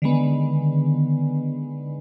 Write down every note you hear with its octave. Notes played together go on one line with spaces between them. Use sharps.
D3 D#3 G#3 B3